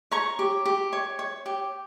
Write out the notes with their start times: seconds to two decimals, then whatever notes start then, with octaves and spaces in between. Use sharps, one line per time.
0.11 C#5 A#5 C#6
0.39 G4
0.65 G4
0.93 C#5
1.19 C#5
1.46 G4